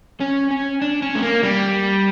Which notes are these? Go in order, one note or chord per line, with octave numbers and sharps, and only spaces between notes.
C#4
C#4
D4
C#4
A3
A#3
G3